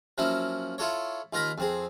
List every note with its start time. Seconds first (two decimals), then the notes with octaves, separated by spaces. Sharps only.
0.18 F3 F#3 A#3 C#4 E4
0.78 E4 F4 A4 C#5
1.33 D#2 F4 A#4 A#5 B5
1.58 F2 C4 G#4